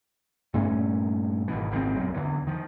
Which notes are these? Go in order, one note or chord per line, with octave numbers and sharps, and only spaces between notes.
G2 A#2 A3 C#4
G#1 B2 E3
G#1 C#2 A#2 C4
B1 F#2
E2 D3 E3
D#3 F3